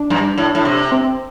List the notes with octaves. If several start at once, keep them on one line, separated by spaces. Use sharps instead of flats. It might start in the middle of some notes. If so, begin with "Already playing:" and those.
Already playing: D4
G2
A2
A2
C3
C4